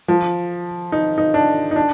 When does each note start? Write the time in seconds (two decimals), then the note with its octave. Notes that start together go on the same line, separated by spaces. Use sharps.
0.08 F3
0.92 D#4
1.18 D#4
1.34 D4
1.71 D#4
1.76 D4